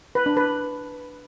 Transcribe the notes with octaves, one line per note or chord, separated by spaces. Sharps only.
B4
D4
B4